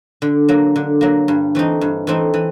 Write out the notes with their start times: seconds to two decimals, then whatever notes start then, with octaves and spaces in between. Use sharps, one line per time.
0.22 D3
0.49 F#3 A#3
0.76 D3
1.01 F#3 A#3
1.28 G2
1.55 E3 A3 C4 D#4
1.81 G2
2.07 E3 A3 C4 D#4
2.34 E3